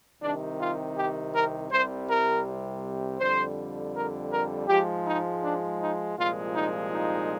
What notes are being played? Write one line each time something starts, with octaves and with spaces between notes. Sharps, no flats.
C2 C3 D#3 D4
F4
G4
A#4
C2 C3 G3 C5
A#4
F2 D3 G3 C5
A#4
A#4
G#2 F3 G#3 G4
D#4
D4
D#4
C2 A#2 F3 G#3 F4
D#4
D#4